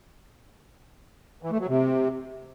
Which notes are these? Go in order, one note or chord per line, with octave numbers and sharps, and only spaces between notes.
E3
A3
F#3
C3